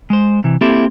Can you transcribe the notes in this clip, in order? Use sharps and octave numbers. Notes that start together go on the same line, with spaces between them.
G#3 C5
C3 E3
A#3 C4 E4 G4 A4